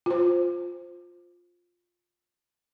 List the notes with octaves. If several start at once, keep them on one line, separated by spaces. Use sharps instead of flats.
F4 C5